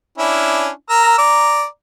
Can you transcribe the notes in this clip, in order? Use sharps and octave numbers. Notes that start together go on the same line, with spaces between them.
C#4 D4 E4
A#4 A#5 E6
D5 A#5